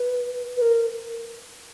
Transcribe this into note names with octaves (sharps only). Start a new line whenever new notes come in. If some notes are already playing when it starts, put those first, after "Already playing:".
Already playing: B4
B4
A#4